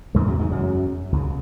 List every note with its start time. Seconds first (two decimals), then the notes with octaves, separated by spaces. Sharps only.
0.15 E2 G#2 G#3
0.19 C#3
0.27 F#2 F#3
0.40 G#2 G#3
0.51 F#2 F#3
1.12 C#2 C#3